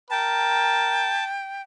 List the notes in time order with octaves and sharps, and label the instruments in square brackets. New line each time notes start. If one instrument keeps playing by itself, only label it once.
[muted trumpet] A#4 [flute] G5 [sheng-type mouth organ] A5